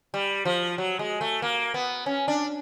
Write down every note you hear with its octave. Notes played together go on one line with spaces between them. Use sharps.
G3
F3
F#3
G#3
A3
A#3
B3
C#4
D4